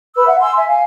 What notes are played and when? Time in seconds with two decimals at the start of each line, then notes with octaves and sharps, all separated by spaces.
0.15 B4 B5 E6
0.27 E5 F#5
0.40 G#5 C6 E6
0.56 E5 G#5
0.68 F5 G#5